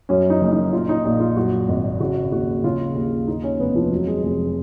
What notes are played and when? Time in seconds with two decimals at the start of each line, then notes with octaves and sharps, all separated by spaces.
0.09 F#2 C#4
0.30 D#4
0.41 F#1
0.52 D#4
0.73 A#2 F4
0.89 D#4
1.05 A#1
1.20 F4
1.36 F#2 F#4
1.68 G#1
2.00 C#3 F#4
2.32 D#2 F#4
2.64 C#3 F4
2.95 D#2
3.28 D#2 D#4
3.43 C#4
3.60 F1 B3
3.76 F3
3.91 F2 F#3
4.07 G#3
4.23 F1 G#3